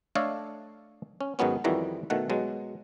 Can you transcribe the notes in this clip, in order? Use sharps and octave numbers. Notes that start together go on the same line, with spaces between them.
A3 D4 A4 C#5 D#5 F5
C#4
G#2 D#3 F#3 B3 C#4
F2 D#3 E3 G3 F#4 A#5
B2 D#3 A3 F#5
B2 F#3 G#3